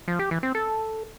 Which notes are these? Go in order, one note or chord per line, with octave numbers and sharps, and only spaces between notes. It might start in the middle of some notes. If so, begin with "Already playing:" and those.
F3
G4
E3
C4
A4